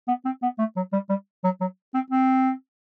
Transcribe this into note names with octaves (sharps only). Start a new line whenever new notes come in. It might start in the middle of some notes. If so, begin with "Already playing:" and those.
B3
C4
B3
A3
F#3
G3
G3
F#3
F#3
C4
C4